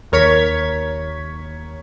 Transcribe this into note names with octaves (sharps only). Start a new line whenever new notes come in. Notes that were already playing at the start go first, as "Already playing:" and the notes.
D#2 A#4 C#5 C#6 G#6 B6